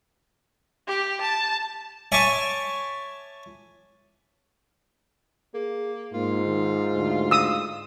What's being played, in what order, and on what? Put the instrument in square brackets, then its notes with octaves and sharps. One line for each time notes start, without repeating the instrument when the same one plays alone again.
[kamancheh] G4
A5
[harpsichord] C#5 E5 G#5 A5 C#6 D6
[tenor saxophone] A#3 [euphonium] G#4
[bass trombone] G#2 [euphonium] A#3 [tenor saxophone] F4
[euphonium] D#3
D2
[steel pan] D#6 E6